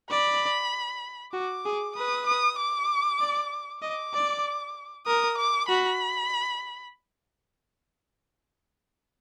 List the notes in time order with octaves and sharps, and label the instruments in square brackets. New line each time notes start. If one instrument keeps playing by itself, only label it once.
[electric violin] D5 [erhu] B5
[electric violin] F#4 [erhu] D6
[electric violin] G#4
[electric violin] B4 [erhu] D#6
[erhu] D#6
D6
[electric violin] D5
[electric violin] D#5 [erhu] D6
[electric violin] D5
[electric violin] A#4 [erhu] D#6
[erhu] D6
[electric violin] F#4 [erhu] B5